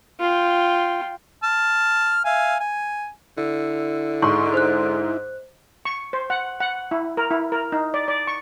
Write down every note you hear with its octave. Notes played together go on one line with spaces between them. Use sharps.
F4 G5
A5 F6
E5 F5 G#5
G#5
D3 E4
G#2 C6 C#6
C5 F#6
C#6
C5
F#5
F#5
E4
A#4
E4
A#4
D#4
D5
D5
C#6